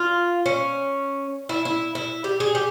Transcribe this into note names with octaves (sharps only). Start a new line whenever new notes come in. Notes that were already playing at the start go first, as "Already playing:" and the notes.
Already playing: F4
C#4
E4
E4
E4
G4
G#4
G4